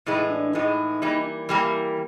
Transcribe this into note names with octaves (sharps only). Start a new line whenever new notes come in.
A2 E3 G#3 D#4
D4
A2 E3 G#3 D#4
E3 G3 A#3
E3 G3 A#3 E4